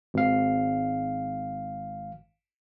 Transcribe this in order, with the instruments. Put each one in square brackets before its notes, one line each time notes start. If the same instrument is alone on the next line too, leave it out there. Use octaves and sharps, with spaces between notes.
[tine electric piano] G#1 F5